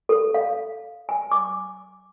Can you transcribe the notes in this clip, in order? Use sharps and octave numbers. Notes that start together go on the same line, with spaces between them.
A4
F5
G#5
D6